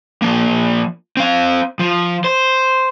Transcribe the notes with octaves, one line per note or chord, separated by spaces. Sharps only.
F3 A#3
C4 F5
F3
C5